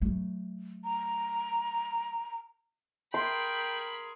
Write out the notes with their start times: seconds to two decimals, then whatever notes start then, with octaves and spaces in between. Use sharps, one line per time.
0.01 F#3 A3
0.84 A#5
3.14 G#4 A#4 G5 B5 C6